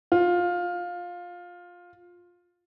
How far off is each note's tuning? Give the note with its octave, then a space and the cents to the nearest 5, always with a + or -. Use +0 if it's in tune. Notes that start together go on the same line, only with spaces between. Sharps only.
F4 +15